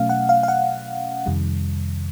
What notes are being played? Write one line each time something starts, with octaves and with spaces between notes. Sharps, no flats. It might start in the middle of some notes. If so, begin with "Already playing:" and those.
Already playing: B2 F#3 A3 C#4 F5
F#5
F5
F5
F#5
F2 C3 D#3 G3